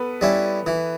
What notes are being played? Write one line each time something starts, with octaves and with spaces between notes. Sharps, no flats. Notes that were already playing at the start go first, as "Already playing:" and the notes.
Already playing: B3 A4 B4
G3 C#4 E4
E3